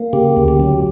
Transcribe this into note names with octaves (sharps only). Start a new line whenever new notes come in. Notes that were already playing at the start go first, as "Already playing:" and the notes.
Already playing: A#3
C#3 G4
D2
G4
F#3